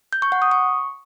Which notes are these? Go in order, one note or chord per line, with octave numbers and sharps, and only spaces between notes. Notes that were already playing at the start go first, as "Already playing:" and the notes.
G6
C#6
F#5
D#6
C#6